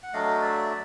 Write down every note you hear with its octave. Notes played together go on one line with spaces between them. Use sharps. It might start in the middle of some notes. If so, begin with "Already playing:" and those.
F#5
F#3 A3 D4 D#5 F5
D5 E5